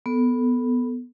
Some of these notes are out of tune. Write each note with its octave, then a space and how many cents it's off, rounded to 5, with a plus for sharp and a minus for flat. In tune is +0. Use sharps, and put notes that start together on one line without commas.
B3 +0 A4 +0